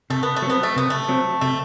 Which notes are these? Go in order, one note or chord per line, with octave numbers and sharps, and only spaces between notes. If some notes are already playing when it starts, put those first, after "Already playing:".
C3 A3
B3
A3
F#3
B3 C4
A3
C3 B3
A3
F#3 C4
C3 A3